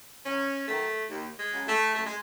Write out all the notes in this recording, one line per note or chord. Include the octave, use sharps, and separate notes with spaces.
E2 C#4
D#3 F#3 A3
D#2
G#3
C#3 F#3
A3
F#2 A3
G#3